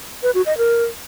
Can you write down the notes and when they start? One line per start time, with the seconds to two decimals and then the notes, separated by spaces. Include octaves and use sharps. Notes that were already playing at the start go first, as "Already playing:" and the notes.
0.23 B4
0.34 F#4
0.46 D#5
0.58 A#4